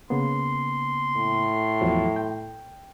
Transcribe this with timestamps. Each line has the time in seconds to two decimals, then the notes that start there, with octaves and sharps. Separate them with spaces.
0.10 C#3 A#3 B3 C6
1.16 A2
1.81 E2 F3 F#3
2.16 G5